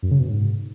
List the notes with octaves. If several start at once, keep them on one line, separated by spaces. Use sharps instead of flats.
F#2
C#3
B2
G#2